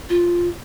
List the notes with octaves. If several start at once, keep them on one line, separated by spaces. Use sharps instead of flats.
F4